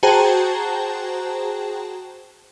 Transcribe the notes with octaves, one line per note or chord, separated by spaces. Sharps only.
F#4 G#4 C5 G5 A5 A#5